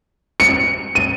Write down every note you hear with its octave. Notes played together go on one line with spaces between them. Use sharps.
C#7
D#7